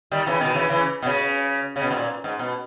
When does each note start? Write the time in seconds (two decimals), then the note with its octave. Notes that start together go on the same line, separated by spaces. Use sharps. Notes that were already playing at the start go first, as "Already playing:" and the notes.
0.11 D#3 G3
0.27 C#3 E3
0.40 B2 D#3
0.54 C#3 E3
0.69 C#3 E3
1.02 B2
1.06 C#3
1.76 C#3
1.81 B2
1.91 G#2
1.96 A#2
2.24 G#2
2.39 B2